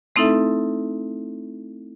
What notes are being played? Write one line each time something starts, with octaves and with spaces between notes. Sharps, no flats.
A3 C4 D#4 E4 A4 E5